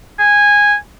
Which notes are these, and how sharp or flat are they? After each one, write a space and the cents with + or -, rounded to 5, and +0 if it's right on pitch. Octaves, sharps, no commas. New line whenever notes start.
G#5 -10